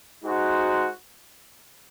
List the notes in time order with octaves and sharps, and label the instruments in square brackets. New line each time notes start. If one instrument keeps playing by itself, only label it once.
[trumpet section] G#3 D#4 F#4 C5